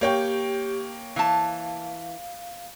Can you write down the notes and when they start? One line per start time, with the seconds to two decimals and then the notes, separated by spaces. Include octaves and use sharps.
0.01 A#3 G4 C#5 G5
1.16 E3 F5 A5